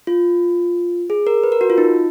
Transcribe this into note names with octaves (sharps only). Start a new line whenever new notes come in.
F4
G#4
A#4
B4
A#4
F#4
F4
D#4